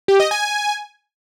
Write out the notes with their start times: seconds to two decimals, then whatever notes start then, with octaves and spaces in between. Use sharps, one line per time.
0.08 G4
0.20 D#5
0.31 G#5